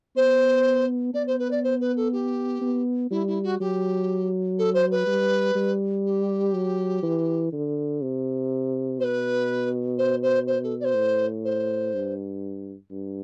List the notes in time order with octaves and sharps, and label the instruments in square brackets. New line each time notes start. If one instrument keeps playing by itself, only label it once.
[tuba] B3 [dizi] C5
[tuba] B3 [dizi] D5
[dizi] C5
B4
D5
C5
B4
A4
G4
[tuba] B3
[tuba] G3 [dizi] E4
[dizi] E4
F#4
[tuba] F#3 [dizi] G4
[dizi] A4
C5
B4
[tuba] G3
G3
[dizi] G4
[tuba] F#3
E3
D3
C3
[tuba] B2 [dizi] C5
[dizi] B4
C5
C5
C5
A4
D5
C5
[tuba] A2
[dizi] C5
[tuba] G2
G2